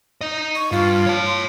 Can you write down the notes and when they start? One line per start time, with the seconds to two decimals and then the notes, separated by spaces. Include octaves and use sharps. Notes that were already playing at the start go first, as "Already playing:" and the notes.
0.21 D#4 D#5
0.56 C#6
0.72 G2 F4
1.06 C#5 A5
1.26 C6